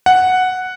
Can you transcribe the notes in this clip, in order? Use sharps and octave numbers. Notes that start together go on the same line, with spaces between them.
F#5